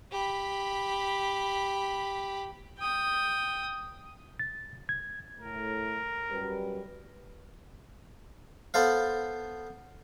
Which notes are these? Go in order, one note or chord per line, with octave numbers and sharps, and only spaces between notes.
G4 B5
G5 D#6
A6
G#6
A2 A3 A#4
F#2 G3 B4
B3 A4 C5 F5